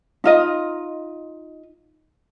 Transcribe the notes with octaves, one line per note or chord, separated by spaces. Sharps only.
D#4 F4 D#5